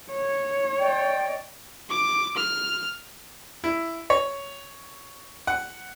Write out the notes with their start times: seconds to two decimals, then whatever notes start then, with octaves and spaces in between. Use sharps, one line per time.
0.11 C#5
0.80 D5 D#5 G5
1.89 D6
2.37 F6
3.64 E4
4.10 C#5
5.47 F#5